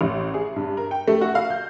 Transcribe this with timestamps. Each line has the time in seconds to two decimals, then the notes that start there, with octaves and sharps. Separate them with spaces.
0.01 A1
0.34 G#4
0.56 G2
0.77 A#4
0.91 G5
1.08 A3
1.21 F#4
1.35 F5
1.50 G6